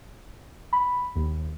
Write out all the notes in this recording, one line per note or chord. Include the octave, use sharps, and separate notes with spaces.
B5
D#2